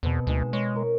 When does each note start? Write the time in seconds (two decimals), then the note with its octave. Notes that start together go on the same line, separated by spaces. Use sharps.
0.03 E2 B2 B3 C4
0.27 D2 G#3 D#4 E7
0.53 G#3 C#5
0.76 A#4